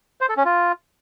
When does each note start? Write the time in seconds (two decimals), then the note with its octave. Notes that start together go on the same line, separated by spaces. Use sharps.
0.21 C5
0.29 A4
0.37 C#4
0.45 F4